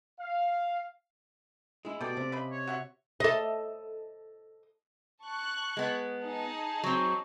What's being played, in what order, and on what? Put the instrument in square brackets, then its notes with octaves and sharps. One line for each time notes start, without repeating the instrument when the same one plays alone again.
[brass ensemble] F5
[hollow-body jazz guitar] G#3 E4
[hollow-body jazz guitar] B2 [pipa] G4 A4 [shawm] D5
[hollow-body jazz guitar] C3
[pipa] C#3 G#3 B5
[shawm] C#5
[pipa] F#4 E5 F#5
[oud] A4 D#5
[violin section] A5 C#6 F#6
[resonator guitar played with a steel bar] G#3 B3
[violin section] D#4 G#4 A5
[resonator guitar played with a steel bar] F#3 C4